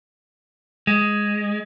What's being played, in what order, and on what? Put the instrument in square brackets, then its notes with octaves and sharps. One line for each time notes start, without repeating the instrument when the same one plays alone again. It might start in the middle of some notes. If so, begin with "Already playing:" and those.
[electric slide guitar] G#3